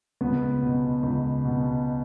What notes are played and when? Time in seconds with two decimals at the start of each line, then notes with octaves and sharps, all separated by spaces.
0.21 C#2 B3
0.62 B2
1.03 C#2
1.45 B2